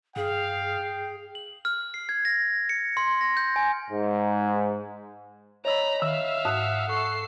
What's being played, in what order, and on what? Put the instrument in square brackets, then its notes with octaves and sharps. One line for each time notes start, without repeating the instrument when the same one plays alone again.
[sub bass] G2 [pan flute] G#4 [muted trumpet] F5 [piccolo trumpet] G5
[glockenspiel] F#7
F6
C7
G#6
A#6
C#7
C6
A#6
G6
G#5
[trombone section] G#2
[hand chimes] C#5 D#5 E6 [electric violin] A#5 B5
[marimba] D#3 [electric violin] E5 F5
[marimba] G#2 [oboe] F#5 [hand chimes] D#6
[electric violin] A4 C7 [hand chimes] C#6